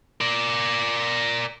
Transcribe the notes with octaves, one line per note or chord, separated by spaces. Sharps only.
A#4 D5